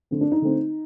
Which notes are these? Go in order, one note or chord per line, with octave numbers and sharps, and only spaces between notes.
D3 A3 C4
D4
D#4
D3 A3 C4